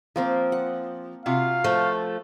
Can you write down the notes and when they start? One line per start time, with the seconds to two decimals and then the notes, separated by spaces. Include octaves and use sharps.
0.16 F3 A#3 C4 A#4
0.52 F#5
1.26 C3 F4 F#4 F5
1.64 F3 A3